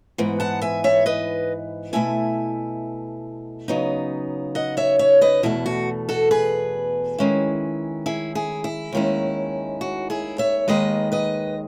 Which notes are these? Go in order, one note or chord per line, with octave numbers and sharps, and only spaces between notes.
G#2 E3 B3
F#5 A5
E5 G#5
C#5 E5
B4 D#5
B2 A3 E4 E5 G#5
C#3 F#3 B3 D#4
D#5 F#5
C#5 E5
C#5 E5
B4 D#5
E2 B2 A3 E4
F#4
F#4 A4
G#4 B4
D#3 G#3 C#4 E4
E4 G#4
E4 G#4
E4
D#2 D#3 G#3 C#4 E4
F#4
E4 G#4
C#5 E5
D#2 D#3 G#3 B4 D#5
B4 D#5